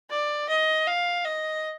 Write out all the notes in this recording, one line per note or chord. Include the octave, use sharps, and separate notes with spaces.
D5
D#5
F5
D#5